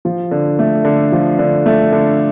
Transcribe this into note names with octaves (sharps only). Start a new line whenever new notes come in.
F3
D3
A3
D3
F3
D3
A3
D3